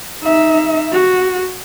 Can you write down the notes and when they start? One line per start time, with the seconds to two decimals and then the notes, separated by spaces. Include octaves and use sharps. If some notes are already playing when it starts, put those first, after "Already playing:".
0.23 D#4 E5
0.92 F#4